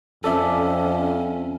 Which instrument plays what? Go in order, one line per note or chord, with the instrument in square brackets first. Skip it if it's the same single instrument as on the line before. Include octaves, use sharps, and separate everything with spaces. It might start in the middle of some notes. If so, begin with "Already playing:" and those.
[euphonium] F2 [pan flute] C#4 [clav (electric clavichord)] A4 D5 E5